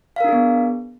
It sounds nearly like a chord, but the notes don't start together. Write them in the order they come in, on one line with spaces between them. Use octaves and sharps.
F5 A#4 D4 G#4 B3